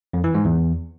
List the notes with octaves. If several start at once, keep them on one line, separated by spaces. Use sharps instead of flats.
F2
E3
G#2
E2